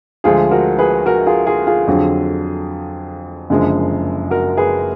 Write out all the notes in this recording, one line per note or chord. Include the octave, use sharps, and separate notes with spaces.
D2 D3 F3 G#3 F4 G#4
F#4 A#4
G#4 B4
F#4 A#4
F4 G#4
F4 G#4
F4 G#4
F2 D3 F#3
F#1 F#2 D3 F3 G#3
F#4 A#4
G#4 B4